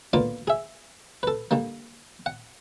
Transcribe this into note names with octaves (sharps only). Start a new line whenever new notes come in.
D3 A#3 B3 F4 D5 D6
G#4 E5
A4 B4
D3 G3 A#3
F#5